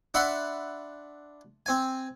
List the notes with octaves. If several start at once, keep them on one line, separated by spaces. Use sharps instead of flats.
D4 E5 F#5 B5 C6
C4 G#5